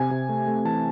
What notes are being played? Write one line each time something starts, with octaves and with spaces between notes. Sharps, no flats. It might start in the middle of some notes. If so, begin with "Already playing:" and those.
Already playing: C3 G#5
C3
A3
A3
E3 A5